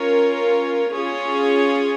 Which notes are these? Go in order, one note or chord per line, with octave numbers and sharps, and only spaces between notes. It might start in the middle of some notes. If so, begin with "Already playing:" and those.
Already playing: C#4 F4 A#4 C#5
C#4 F4 G#4 C#5